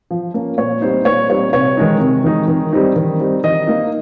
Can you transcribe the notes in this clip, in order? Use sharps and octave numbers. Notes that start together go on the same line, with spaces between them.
F3
A#3 C#4
A#2 C#5
G3 C4 D#4 C5
A#2 C#5
G3 C4 D#4 C#5
C3 C#5
D#3 G#3 D#4
C3
D#3 G#3 D#4
D#3
G3 C4 D#4
D#3
G3 C4 D#4
D#3 D#5
A#3 D#4